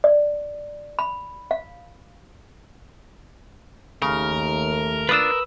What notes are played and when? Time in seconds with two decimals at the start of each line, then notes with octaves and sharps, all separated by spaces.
0.04 D5
0.99 B5
1.51 F5
4.02 D#2 C#3 A3 A#4
5.09 D4 F4 B4 D#6 E6